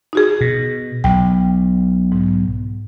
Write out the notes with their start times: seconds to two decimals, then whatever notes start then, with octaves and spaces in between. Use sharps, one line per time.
0.13 D#4 F#4 G#4
0.41 B2
1.04 B1 G5
2.12 G#2